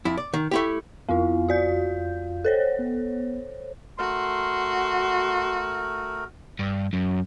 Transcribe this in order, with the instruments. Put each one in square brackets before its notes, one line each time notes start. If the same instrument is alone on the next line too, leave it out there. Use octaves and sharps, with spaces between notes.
[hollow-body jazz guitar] F2 E4
D5
D#3
A3 E4 G4
[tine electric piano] F2 F4 F5 [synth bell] B3 E4
[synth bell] F#4 D5 G6
A4 C5 C#5
[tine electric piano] B3
[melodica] A3 A#4 [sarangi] F#4 [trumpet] C6
[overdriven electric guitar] G2
F#2